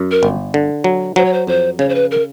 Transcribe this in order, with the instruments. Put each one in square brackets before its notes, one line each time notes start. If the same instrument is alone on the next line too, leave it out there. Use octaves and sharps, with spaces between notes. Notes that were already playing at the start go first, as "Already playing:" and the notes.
Already playing: [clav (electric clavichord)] F#2
[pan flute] A#4
[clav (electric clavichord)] G1
D3
F#3
[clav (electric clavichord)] F#3 [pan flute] C5
[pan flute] C#5
C5
[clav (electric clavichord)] F2 [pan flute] C5
[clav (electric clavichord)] C#3 [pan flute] C#5
[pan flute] C5
B4
A#4